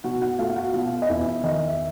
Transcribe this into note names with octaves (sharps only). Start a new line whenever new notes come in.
B2 F#4 F#5
F#4 F#5
A3 F4 F5
F5
F#4 F#5
B2 F4 F5
D#5
E2 E4 E5
E5
D#3 D#4 D#5
E5